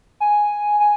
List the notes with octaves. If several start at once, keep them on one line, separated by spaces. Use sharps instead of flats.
G#5
G#5